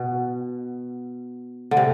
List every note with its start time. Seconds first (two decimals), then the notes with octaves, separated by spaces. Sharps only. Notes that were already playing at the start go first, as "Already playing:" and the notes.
Already playing: B2
1.71 D3
1.77 C3